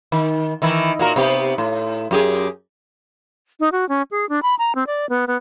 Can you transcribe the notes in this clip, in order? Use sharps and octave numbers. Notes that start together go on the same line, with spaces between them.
D#3
D#3 E3 E4
A#2 F#4 A#4
C3 B3 G4
A2
F#2 G4 G#4
D#4
F#4
C#4
G#4
D4
B5
A#5
C4
D5
B3
B3